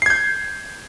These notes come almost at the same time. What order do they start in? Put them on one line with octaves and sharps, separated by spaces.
C7 G#6 G6